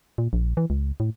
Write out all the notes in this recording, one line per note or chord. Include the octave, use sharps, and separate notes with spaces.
A#2
A#1
E3
C#2
A2